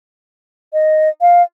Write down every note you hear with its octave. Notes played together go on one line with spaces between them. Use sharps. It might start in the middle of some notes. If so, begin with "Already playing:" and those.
D#5
F5